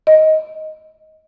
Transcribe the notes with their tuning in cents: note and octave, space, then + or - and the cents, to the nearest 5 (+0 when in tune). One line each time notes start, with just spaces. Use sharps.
D#5 +10